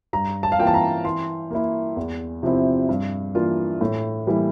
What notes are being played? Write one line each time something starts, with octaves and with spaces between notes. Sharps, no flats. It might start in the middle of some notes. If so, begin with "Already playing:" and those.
G2 A#5
A5
F5
E3 A#3 F4 G5
A5
A#5
E3 C6
A#3 E4
E2
C3 F3 C4 E4
G2
E3 A#3 D4 F4
A2
E3 G3 A#3 E4